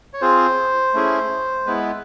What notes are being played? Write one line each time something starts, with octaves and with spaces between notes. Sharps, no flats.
C#5
C4 F4 G#4 C5
A3 C#4 E4 G#4
G#3 B3 E4 B4